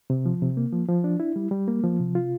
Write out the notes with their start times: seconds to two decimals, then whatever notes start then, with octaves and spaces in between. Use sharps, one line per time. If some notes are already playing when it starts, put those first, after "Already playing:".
0.10 C3
0.26 F3
0.42 C3
0.57 A#3
0.72 F3
0.88 F3
1.04 D4
1.20 E4
1.36 G3
1.51 G3
1.68 A#3
1.83 F3
1.99 C3
2.15 F4